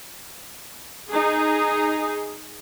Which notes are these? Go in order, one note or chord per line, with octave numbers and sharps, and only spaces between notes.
D#4 G#4